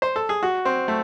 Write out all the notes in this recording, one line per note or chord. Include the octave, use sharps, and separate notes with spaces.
C5
A4
G#4
F#4
C4
A3